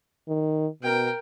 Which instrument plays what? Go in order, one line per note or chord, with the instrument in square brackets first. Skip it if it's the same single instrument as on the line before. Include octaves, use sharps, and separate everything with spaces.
[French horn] D#3
[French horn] B2 [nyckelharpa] A#4 G5